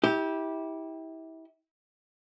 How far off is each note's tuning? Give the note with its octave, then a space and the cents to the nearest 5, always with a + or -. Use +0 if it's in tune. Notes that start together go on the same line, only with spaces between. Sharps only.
E4 -30 G4 +0